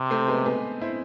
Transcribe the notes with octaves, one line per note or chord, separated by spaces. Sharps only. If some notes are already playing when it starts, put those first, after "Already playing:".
Already playing: C3
A3 C4
G#3 B3
G#3 B3
C4 E4